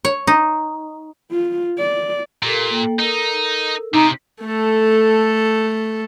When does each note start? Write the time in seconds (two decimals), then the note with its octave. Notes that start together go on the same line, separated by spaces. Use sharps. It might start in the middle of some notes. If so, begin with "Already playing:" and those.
0.05 C#5
0.27 D#4
1.31 F4
1.78 D5
2.43 A#2 G4 A4 A#4
2.71 A#3 A4 G5
2.99 D#4 A4 A#4 E6
3.94 C3 D#4
4.42 A3 A4